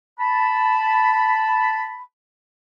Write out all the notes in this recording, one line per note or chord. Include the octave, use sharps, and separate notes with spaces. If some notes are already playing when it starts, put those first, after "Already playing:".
A5 B5